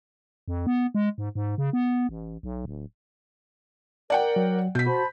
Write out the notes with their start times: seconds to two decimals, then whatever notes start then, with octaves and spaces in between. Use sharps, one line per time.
0.48 F2
0.66 B3
0.95 G#3
1.18 G#2
1.35 G#2
1.58 C#3
1.73 B3
2.09 A1
2.43 B1
2.65 D1
4.10 A#4 D5 F#5 G5
4.36 F#3
4.75 B2 G6 B6
4.87 F#4 C5 A5 B5